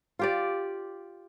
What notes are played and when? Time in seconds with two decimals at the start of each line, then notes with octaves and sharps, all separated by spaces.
0.19 F4 G4 D5